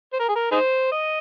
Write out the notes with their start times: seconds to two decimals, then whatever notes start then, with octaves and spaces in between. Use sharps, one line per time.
0.13 C5
0.20 A#4
0.29 G#4
0.35 A#4
0.52 D#4 G#4 C5
0.92 D#5